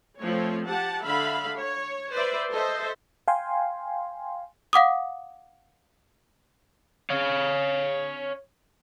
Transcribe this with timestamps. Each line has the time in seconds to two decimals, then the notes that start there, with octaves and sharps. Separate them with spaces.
0.19 F3 A3 C4 C#5
0.66 G4 F#5 A5
1.04 D3 E5 F5 B5
1.58 C#5
2.14 B4 C5 D5 E5
2.52 A4 C5 D#5 E5
3.28 F5 G5 G#5 C6
4.73 F5 F#5 D6 D#6
7.10 C#5 F5